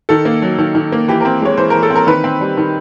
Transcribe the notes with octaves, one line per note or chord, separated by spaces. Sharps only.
D#3 A4
A#3
F#3
D#3
D#3
A#3
E3 G4
C4 A#4
G#3 C#5
E3 C5
E3 A#4
A4
C4
A#4
D#3 B4
C4
G3
D#3